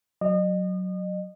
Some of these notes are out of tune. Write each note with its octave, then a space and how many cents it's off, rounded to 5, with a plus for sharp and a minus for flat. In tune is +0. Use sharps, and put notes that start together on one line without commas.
F#3 +0 D#5 -35